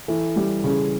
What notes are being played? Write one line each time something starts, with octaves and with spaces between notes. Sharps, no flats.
E3 A4
G3
C#3